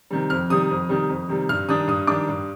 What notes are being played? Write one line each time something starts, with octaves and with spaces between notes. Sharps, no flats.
C3 D#3 G3
F2 F6
C3 D#3 G3 D#6
F2
C3 D#3 G3
F2
C3 D#3 G3
G2 F6
D#3 G3 D4 D#6
G2 D#6
D#3 G3 D4 D6
G2